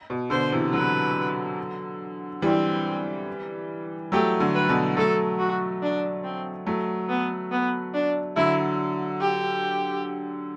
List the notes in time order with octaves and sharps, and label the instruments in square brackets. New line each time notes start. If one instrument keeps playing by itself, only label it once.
[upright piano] B2
[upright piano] B2 D3 [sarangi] C5
[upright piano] C3 E3
[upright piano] D3 F#3 [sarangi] B4
[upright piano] E3 G3 [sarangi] C4
[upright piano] F#3 A3 [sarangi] G4
[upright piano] D3 F#3
[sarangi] B4
[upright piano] B2 D3
[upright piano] F#3 A3 [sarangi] A4
[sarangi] F#4
D4
C4
[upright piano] F#3 A3
[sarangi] B3
B3
D4
[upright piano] D3 F#3 [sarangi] E4
[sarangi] G4